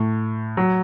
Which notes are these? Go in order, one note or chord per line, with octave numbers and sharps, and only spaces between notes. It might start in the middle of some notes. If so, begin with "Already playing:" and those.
Already playing: A2
F#3